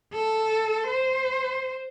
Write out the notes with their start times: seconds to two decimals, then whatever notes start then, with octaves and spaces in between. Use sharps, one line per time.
0.13 A4
0.87 C5